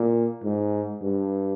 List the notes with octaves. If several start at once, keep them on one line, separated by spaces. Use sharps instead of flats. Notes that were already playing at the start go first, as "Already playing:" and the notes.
Already playing: A#2
G#2
G2